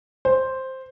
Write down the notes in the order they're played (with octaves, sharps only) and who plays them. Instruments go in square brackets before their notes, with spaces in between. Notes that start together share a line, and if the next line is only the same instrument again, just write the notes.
[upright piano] C5